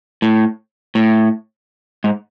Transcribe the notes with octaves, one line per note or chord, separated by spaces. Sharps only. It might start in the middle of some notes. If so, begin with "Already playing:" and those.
A2
A2
G#2